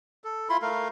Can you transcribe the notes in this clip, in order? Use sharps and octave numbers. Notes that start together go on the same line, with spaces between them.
A4
E4 F4 B5 C6
A3 A#4 F5